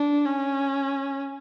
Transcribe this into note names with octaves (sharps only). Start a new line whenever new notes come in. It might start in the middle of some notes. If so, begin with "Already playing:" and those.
Already playing: D4
C#4